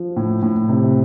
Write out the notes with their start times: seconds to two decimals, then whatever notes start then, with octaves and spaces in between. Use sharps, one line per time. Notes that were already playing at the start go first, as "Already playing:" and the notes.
Already playing: F3
0.16 A2
0.42 A2
0.69 C3